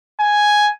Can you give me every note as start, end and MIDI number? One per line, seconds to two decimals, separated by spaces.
0.20 0.70 80